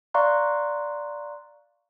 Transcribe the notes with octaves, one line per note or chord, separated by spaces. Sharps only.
D5 F5 A#5 C6 C#6 F#6